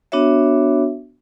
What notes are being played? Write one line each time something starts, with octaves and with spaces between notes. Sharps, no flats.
B3 D4 F#4 C#5 E5